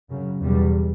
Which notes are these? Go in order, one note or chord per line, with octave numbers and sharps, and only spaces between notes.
F#2 C#3
E2 B2 G3